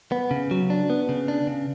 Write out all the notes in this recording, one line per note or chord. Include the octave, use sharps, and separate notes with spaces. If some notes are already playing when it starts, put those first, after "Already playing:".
B3
C#3
F#3
D4
B3
C#3
D4
C#3